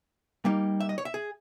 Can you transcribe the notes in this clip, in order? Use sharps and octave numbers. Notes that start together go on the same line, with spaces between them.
G3 A#3 D#4
E5
D#5
C#5
E5
G#4